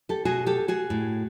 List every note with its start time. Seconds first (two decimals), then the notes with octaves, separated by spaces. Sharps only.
0.09 G4 A4
0.25 B2 F#4 G#4
0.46 G4 A4
0.68 F#4 G#4
0.90 A2